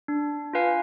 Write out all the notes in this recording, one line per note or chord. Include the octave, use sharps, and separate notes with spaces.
D4
F4 B4 F5 G#5